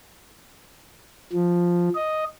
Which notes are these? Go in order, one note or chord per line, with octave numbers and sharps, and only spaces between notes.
F3
D#5